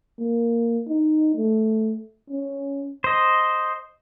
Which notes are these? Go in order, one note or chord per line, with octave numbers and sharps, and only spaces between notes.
A#3
D#4
A3
C#4
C5 D#5